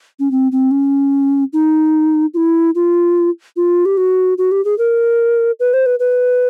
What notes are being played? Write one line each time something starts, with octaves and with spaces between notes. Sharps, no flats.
C#4
C4
C4
C#4
D#4
F4
E4
F4
F4
G4
F#4
F#4
G4
G#4
A#4
B4
C5
B4
B4